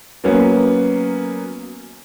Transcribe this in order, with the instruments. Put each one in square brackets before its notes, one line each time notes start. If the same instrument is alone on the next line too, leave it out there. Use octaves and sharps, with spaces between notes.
[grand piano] F#3 A#3 B3 C#4